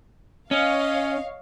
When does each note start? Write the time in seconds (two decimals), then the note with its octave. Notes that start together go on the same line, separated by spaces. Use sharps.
0.51 C#4 C#5 D#5 F5